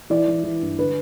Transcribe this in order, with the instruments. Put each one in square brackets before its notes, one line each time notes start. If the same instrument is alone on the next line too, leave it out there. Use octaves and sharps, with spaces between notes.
[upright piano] E3 D5
E3
E3
G2
D3 B4